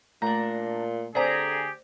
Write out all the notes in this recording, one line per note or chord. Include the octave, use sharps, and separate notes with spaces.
A#2 A3 D4 A#5
D3 C4 G4 G#4 C5 D5 A#5